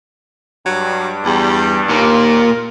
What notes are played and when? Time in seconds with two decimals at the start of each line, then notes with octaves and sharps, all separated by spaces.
0.66 G2 F#3
1.25 E2 G3
1.89 D#2 A#2 F4 A#4